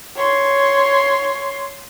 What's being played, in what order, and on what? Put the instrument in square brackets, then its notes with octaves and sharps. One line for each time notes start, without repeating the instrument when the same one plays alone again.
[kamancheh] C#5 C6